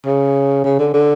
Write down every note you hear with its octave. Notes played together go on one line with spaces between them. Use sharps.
C#3
C#3
D3
D3